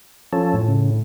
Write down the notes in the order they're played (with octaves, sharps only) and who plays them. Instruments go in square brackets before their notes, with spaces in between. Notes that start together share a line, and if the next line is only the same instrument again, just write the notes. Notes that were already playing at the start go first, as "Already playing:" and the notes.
[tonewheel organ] F3 C#4 A4
[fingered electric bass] A2
[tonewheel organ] C#3